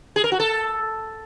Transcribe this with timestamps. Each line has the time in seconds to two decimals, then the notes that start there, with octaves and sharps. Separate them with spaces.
0.16 G#4
0.24 A#4
0.32 F#4
0.40 A4